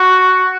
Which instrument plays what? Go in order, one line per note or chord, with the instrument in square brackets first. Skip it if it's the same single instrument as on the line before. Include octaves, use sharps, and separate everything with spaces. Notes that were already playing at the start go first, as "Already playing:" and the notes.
Already playing: [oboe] F#4